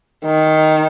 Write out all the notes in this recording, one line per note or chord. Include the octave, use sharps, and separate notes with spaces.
D#3